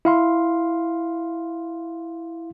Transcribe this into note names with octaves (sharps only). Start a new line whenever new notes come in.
E4 F5 C6